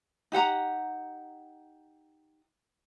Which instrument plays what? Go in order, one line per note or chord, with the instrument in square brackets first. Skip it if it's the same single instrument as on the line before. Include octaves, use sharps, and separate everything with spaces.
[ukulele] D#4 G4 F#5 A#5